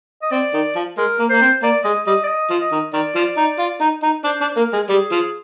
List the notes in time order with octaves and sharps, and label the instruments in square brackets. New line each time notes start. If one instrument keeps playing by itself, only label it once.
[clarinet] D#5
[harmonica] C4 [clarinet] D5
[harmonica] D#3
F3
[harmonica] G#3 [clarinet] A#4
[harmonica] A#3
[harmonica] A#3 [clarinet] C5
[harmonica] C4
[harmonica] A#3 [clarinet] D5
[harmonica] G#3 [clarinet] D#5
[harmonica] G3 [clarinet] D#5
[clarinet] D5
D#5
[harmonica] F3
[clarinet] D#5
[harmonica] D#3
[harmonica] D#3 [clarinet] D5
[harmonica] F3
D#4
F4
D#4
D#4
[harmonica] D4 [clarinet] C5
[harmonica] D4
[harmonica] A#3 [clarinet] A#4
[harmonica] G#3
[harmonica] G3 [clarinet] G#4
[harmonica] F3